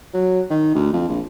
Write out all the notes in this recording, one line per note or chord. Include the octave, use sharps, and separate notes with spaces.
F#3
D#3
D2
F2
A#1